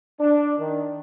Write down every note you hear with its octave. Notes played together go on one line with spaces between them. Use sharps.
D4
D#3